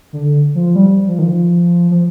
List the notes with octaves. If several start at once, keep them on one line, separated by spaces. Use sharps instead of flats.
D3
F3
G3
F3
D#3
F3
F3